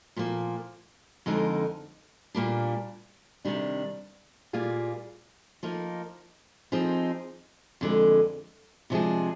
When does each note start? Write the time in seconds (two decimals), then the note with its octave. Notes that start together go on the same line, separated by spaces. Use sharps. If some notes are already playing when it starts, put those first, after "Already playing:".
0.16 A#2 F3 A#3
1.26 F2 D3 G#3 D#4 A#4
2.35 A#2 G3 A#3 D4
3.45 C3 D#3 G3 D4
4.53 A#2 G3 A#3 F4 G#4
5.63 F3 A#3 D#4 A#4
6.72 F3 C4 D#4 G#4
7.81 F2 D3 G#3
8.90 C3 F3 G#3 D4 G#4